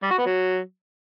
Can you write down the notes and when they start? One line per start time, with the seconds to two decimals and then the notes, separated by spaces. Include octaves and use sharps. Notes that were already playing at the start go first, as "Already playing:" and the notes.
0.03 G3
0.11 F#4
0.19 B3
0.26 F#3